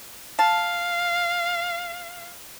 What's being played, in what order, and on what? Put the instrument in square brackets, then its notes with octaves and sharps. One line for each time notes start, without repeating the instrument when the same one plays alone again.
[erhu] F5 [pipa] A5